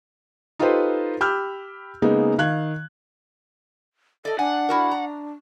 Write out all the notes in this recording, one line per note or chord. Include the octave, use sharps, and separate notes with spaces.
D#4 F4 G4 A4 B4 C5
G4 B5 D6 E6 F6 G6
C#3 G#3 A#3 B3 D#4
D#3 F5 F#6 G#6
A4 D5 D#5
D4 F#5 G#5
E4 F#4 A#4
A#5